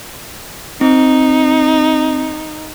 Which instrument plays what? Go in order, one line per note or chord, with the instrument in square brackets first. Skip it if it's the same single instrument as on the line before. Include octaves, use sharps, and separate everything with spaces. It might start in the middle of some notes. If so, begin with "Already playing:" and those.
[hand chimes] C4 [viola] D#4